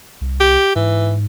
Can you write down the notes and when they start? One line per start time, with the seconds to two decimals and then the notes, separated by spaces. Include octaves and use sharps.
0.21 C2
0.41 G4
0.76 G#2 E3